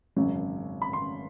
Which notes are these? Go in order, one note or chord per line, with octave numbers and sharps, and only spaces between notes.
G#1 F#2 C#3 F#3
B5
C6